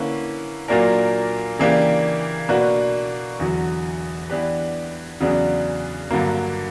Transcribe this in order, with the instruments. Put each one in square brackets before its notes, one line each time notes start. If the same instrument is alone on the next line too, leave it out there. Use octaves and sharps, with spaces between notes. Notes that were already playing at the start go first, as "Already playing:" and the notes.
Already playing: [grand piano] D3 A#3 C#4 E4 B4
A#2 F#3 A#3 D4 A#4
C#3 E3 A#3 D4 G4
B2 A#3 D4 F#4 B4
E2 D3 F#3
E3 B3 D4 G4 B4
E2 C#3 F#3 B3 D4
G2 D3 F#3 A#3